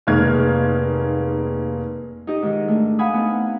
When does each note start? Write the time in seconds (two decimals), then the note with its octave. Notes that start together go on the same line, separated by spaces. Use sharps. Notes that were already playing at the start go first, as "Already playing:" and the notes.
0.07 F1 D#3 G#3 A#3 F6 G#6
2.27 D#4 G4 D#5
2.42 G#2 D#3 D#4
2.68 A3 D4
2.99 F5 F#5 G#5 B5 D#6
3.13 A3 B3 C4 D#4